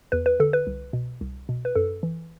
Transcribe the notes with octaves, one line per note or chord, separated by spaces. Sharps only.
E2 B4
B4
D3 A4
B4
C2
B2
C2
B2
B4
F#2 A4
E3